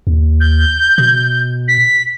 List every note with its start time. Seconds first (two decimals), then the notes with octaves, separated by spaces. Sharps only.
0.07 D#2
0.40 G6
0.98 B2
1.68 B6